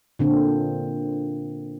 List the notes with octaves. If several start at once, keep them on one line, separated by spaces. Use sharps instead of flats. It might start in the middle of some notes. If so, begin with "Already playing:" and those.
A#2 D3 C4